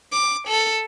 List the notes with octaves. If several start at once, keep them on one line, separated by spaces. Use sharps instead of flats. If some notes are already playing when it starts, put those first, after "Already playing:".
D6
A4